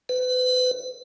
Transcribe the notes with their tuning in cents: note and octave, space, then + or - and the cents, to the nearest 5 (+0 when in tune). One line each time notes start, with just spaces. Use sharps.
B4 +35